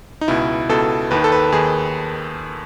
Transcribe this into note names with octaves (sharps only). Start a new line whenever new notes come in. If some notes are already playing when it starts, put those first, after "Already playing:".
D#4
C#2 B2 E4
C#2 B2 A4
D#2 D#3 B4
A4
B4
D#2 D#3 G#4